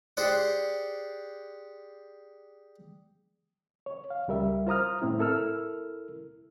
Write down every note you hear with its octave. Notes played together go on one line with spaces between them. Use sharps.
G4 G#4 C5 D5 F#5
C#5
F5
C#2 G3 A#4 E5
F4 C5 A#5 D#6 F6
A2 C4 E4
E4 A4 A#4 E6 F6